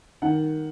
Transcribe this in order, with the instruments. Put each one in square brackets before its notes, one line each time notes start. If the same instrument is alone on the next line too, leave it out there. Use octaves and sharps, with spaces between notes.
[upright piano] D#3 F#5